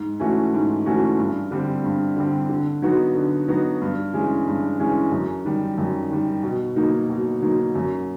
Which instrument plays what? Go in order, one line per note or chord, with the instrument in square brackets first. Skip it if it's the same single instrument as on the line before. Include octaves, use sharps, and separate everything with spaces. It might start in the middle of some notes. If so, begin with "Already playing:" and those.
Already playing: [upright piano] G#2
E3 A3 C#4 F#4
G#2
E3 A3 C#4 F#4
G2
D3 G3 C4
G2
D3 G3 C4
D3
F#3 B3 D#4 F#4
D3
F#3 B3 D#4 F#4
G2
E3 G#3 C#4
G2
E3 G#3 C#4
F#2
D#3 G3
F#2
D#3 G3
B2
F#3 A#3 D#4
B2
F#3 A#3 D#4
F#2